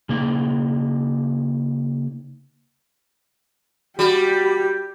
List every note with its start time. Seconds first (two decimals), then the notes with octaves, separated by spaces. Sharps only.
0.09 C#3 A#3 D#4
3.99 G3 F#4 G4